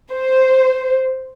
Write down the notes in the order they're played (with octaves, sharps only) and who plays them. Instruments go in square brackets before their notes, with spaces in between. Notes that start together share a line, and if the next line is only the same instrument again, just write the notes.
[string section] C5